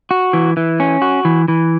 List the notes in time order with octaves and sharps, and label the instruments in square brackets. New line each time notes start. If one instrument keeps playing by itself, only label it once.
[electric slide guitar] F#4
E3
E3
C#4
F#4
E3
E3